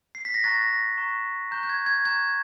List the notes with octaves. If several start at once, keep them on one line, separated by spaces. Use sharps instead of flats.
C7
B6
A#6
A#5 C#6 F#6 A6
A#6
A#5 C#6 F#6
A#5 C#6 F#6 G6
G6
G#6
G#6
A#5 C#6 F#6 G#6